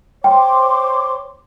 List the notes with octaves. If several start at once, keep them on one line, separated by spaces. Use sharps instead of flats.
C5 C#5 G5 C6 D6